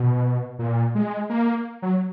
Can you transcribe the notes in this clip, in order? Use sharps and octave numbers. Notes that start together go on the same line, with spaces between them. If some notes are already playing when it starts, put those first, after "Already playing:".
Already playing: B2
A#2
G#3
A#3
F#3